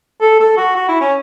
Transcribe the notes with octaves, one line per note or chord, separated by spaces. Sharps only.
A4
A4
F#4
F#4
E4
C#4